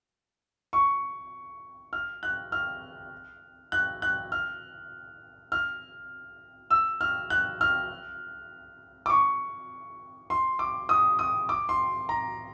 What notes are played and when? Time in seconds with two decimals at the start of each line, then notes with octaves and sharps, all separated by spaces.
0.73 C#6
1.93 F6
2.23 F#6
2.52 F6
3.72 F#6
4.02 F#6
4.32 F6
5.52 F6
6.70 E6
7.01 F6
7.30 F#6
7.61 F6
9.06 D6
9.10 C#6
10.30 C6
10.59 D6
10.89 D#6
11.19 D#6
11.49 D6
11.69 C6
12.09 A#5